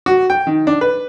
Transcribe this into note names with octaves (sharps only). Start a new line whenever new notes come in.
F#4
G5
D#3
D4
B4